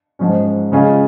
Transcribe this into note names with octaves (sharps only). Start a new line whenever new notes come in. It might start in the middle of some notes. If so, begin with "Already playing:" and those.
G#2 F3 G#3 C#4
C#3 G#3 C#4 F4 G#4